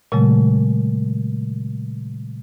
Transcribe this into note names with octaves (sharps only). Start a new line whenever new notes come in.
A#2 C#3 F#3 G#3 A3